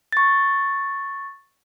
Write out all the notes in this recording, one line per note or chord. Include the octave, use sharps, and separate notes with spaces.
C#6 A6